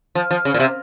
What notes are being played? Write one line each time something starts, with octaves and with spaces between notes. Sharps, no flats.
F3
F3
C#3
A#2
C3